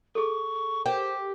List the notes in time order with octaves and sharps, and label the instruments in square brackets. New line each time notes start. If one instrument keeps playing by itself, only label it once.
[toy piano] G#4 A4 [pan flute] C#6
[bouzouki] G4 [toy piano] A#4 [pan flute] C5